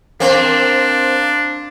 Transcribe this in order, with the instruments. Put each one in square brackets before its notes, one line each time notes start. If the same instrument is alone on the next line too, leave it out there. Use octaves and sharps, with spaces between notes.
[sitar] A#3 C4 [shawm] D4